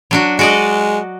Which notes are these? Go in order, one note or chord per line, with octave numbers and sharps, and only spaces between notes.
F#3 D4 F#4
G#3 F#4 D5 D#5